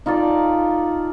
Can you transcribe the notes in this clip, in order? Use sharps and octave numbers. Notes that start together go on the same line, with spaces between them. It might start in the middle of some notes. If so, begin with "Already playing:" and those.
D#4 F4 A4 D5